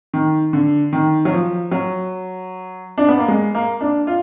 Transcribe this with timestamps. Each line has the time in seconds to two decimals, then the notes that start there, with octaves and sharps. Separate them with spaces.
0.14 D#3
0.53 D3
0.93 D#3
1.25 F#3
1.32 F3
1.71 F#3
2.98 D4
3.09 B3
3.19 A#3
3.28 G#3
3.55 A#3
3.81 D4
4.07 F4